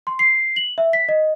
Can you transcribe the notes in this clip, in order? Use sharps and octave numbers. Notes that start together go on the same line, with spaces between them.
C6
C7
F#7
E5
B6
D#5